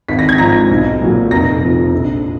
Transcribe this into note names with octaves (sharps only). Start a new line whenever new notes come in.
G#1 B6
A#6
G#6
G#2 F3 A#5 A#6
B1
A#2 F#3
F1 A#5 A#6
F2 F3
A#1